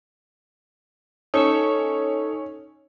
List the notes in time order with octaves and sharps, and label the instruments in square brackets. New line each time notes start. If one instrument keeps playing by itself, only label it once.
[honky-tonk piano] C#4 [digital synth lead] D#4 [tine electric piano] A4 C#6 E6